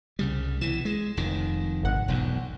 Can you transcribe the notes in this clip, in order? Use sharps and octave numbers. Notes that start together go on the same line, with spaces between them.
C2 C#3 G3
B1 E3 E7
G#3
F1 F2 D#3
G#1 F#5
E1 B1 F2